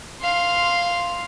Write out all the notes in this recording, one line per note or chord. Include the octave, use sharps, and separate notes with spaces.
F5 C6